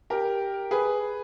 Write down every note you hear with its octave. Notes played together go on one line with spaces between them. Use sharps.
G4 A#4
G#4 B4